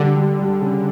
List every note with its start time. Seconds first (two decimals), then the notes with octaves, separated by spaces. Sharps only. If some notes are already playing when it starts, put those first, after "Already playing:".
Already playing: D3 G3
0.16 G3
0.39 G3
0.61 C#3